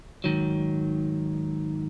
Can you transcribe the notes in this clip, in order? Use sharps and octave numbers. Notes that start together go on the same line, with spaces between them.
G#2 D#3 F#3